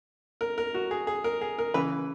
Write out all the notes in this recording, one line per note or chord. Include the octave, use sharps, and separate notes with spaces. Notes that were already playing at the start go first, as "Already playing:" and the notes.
A#4
A#4
F#4
G#4
G#4
A#4
G#4
A#4
C#3 E3 B4